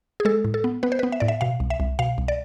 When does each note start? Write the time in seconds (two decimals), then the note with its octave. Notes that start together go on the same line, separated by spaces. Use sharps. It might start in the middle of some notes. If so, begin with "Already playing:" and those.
0.20 G#4
0.25 G#3 A4
0.45 A2
0.54 A4
0.64 B3
0.83 B3 B4
0.92 C5
0.99 B3 B4
1.12 E5
1.20 A2 D5
1.28 E5
1.41 B2 F5
1.60 C2
1.70 E5
1.80 C2
1.99 B2 F5
2.18 C2
2.28 D5